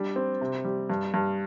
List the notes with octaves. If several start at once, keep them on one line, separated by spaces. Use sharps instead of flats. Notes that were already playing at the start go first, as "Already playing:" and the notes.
Already playing: G3 D4
C4
C3
G3
G2
G2